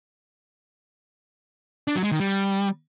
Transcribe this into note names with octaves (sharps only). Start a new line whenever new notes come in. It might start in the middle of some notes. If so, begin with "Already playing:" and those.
D4
F#3
G#3
D#3
G3